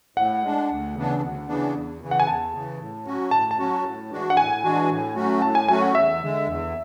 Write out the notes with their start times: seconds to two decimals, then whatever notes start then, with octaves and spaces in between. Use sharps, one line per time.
0.17 A2 F#5
0.43 G#3 D4
0.69 D2
0.95 C#3 E3 B3 D4
1.21 D2
1.47 C#3 E3 B3 D4
1.74 E2
2.01 C#3 E3
2.11 F#5
2.20 G#5
2.27 E2 A5
2.53 C#3 E3
2.80 A2
3.05 F#3 C#4 F#4
3.31 A2 A5
3.51 A5
3.58 F#3 C#4 F#4
3.84 A2
4.11 E3 G#3 D4 F#4
4.30 F#5
4.37 A2 G#5
4.63 E3 G#3 D4 F#4
4.90 A2
5.15 F#3 A3 C#4 F#4
5.42 A2 A5
5.55 G#5
5.68 F#3 A3 C#4 F#4 G#5
5.82 F#5
5.95 E2 E5
6.21 D3 G#3
6.47 E2